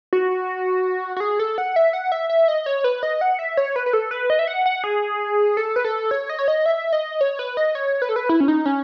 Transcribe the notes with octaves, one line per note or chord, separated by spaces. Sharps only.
F#4
F#4
G#4
A4
F#5
E5
F#5
E5
E5
D#5
C#5
B4
D#5
F#5
E5
C#5
B4
B4
A4
B4
D#5
E5
F#5
F#5
G#4
A4
B4
A4
C#5
D#5
C#5
D#5
E5
D#5
C#5
B4
D#5
C#5
B4
A4
B4
E4
C#4
D#4
C#4